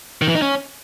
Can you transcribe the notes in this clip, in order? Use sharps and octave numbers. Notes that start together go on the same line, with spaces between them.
D#3
E3
D#4
C#4